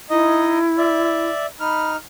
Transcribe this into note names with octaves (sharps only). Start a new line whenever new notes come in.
D#4 E4 D#5
D5 E5
D#4 B5 F6